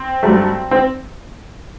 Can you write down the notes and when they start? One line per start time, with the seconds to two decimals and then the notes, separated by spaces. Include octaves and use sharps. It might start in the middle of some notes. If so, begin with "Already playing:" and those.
Already playing: C4
0.23 G2 F#3 A3
0.71 C4